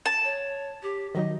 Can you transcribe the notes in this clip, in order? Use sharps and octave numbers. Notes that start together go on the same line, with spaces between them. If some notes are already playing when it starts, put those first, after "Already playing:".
A5
C#5
G4
D#3 F#3 D#4 D#5